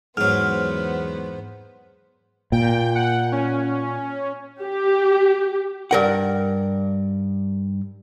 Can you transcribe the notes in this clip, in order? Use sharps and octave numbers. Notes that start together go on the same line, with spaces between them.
E2 G#2 F#3 B3 C5 F6
A#2 G5
F#5
C#4
G4
G2 A#4 F#5